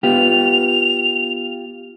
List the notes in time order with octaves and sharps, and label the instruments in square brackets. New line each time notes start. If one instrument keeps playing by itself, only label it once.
[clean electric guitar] B3 F4 G4 [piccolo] F7